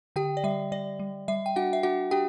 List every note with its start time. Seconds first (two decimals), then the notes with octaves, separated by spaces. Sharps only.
0.16 D3 G4 G5
0.37 D5
0.44 G3 E5
0.72 G3 D5
0.99 G3
1.28 G3 E5
1.46 G5
1.56 D4 F#4 F#5
1.73 E5
1.83 D4 F#4 F#5
2.11 D4 G4 G5